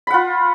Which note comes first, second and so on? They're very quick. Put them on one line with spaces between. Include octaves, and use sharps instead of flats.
B5 F#5 F4